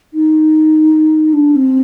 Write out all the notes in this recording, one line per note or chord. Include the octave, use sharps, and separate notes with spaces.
D#4
D4
C4